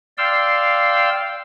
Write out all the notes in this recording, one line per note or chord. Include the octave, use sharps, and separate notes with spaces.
D5 F5 G5 C6 E6